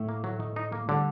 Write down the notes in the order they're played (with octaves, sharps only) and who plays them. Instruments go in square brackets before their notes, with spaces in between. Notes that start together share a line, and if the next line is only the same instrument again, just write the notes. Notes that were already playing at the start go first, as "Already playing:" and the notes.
Already playing: [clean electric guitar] A2 A3
[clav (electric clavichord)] A#3
F#3
D#4
D#4
A#3
[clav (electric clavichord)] D3 [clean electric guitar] G3